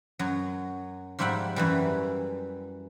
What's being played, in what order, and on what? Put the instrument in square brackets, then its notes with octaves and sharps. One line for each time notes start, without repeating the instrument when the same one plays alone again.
[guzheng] F#2 F#3
G#2 F3 G3 E5 F#5 G5
F#2 E3 G3